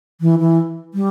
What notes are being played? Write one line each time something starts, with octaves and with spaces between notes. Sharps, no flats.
E3
E3
G3